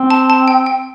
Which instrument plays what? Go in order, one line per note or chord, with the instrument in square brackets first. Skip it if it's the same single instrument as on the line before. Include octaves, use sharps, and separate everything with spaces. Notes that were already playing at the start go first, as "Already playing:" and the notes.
Already playing: [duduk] C4
[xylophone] A5
A5
G5
G5